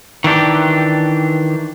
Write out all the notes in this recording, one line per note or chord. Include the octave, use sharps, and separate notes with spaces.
D#3 E3 D4 G4